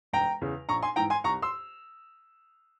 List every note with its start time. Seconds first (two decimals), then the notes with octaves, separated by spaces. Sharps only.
0.13 E1 G5 A#5
0.41 E2 C#3
0.69 A#1 A#5 C#6
0.83 G#5 C6
0.96 G#2 E3 G5 A#5
1.10 G#5 C6
1.24 C2 A#5 C#6
1.42 C6 E6